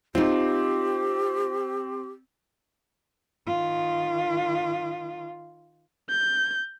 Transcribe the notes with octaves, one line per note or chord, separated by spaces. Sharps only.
C4 D#4 F4 G4
D#3 F4
G6